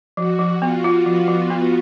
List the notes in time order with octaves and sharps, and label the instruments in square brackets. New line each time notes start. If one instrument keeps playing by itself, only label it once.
[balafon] F3 [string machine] F#4
[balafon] F3
[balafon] B3 [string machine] F4
[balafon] F4
[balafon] F3 [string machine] B3
[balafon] F3
B3